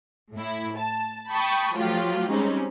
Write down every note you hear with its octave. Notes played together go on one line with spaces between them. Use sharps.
A2 E4
A5
G5 A5 B5 C#6 D#6
F3 F#3 A3 F4 G4
G3 G#3 C4 C#4 D#4